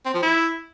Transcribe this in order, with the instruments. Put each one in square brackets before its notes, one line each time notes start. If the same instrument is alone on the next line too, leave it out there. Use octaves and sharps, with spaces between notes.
[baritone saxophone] C4
F3
E4